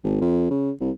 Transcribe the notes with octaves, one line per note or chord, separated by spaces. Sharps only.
G#1
F2
C#3
C2